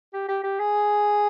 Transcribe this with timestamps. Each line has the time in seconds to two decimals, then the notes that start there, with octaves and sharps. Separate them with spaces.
0.14 G4
0.29 G4
0.43 G4
0.59 G#4